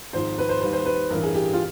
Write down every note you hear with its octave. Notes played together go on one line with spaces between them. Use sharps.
G#1 G#2 F3 C5
B4
C5
D#2 D#3 G3 B4
C5
B4
A1 G2 E3 A#4
G#4
G4
F4